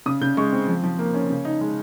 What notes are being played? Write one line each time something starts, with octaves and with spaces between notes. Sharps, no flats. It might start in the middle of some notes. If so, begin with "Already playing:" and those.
C#3 D#6
C#3 G6
G#3 C#6
C4
F3
F3
A#3
C#4
C#3
D#4
G#3